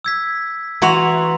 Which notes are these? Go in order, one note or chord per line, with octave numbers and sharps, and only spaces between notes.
E6 G#6 B6
E3 F#4 A#5 C6 F7